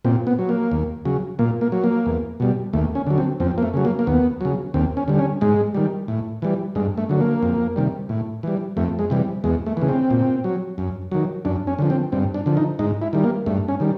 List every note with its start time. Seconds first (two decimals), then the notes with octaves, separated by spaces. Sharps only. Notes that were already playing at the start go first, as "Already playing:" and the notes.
0.05 A#2 C4
0.27 B3
0.39 F#3
0.49 A#3
0.72 D#2
1.05 C#3 F#3
1.39 A#2 A#3
1.61 A#3
1.72 F#3
1.84 A#3
2.06 E2
2.40 B2 G3
2.73 D#2 A3
2.95 C#4
3.07 D3 F#3
3.18 C4
3.40 F2 C4
3.58 A#3
3.63 A3
3.74 C#3 F#3
3.85 A#3
3.99 A#3
4.07 D#2 B3
4.41 C#3 F#3
4.74 D#2 C4
4.97 C#4
5.08 D3 G3
5.19 C#4
5.41 G#2 G#3
5.74 D#3 G3
6.08 A2
6.42 E3 G3
6.75 G2 G#3
6.98 A3
7.09 D3 F#3
7.20 A#3
7.43 F2
7.76 C3 D#3 G3
8.09 A2
8.43 E3 G3
8.77 F2 A3
8.99 G#3
9.10 C3 E3 G3
9.44 E2 G#3
9.66 A3
9.77 C#3 E3
9.89 C4
10.11 A#2
10.44 F#3
10.78 F#2
11.11 D#3 F#3
11.45 F#2 D4
11.67 C#4
11.79 D3 F3
11.90 C4
12.12 G2 C4
12.34 D4
12.46 D3 F3
12.57 D#4
12.79 G#2 D#4
13.02 E4
13.13 D#3 G3
13.24 A#3
13.46 G2 A3
13.68 C#4
13.80 D#3 G3